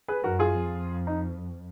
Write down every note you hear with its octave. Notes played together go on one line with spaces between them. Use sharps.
G#4 B4
F#2 F#4 A#4
F4 G#4
F2
D#4